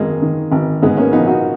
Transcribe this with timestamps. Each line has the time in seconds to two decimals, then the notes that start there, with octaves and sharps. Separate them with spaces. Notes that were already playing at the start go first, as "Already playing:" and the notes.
Already playing: G#1 F#2 G#3 A#3
0.22 D#3
0.52 G#1
0.82 G#2 G#3 B3
0.97 A#3 C#4
1.12 A#1 B3 D#4
1.27 D#4 F#4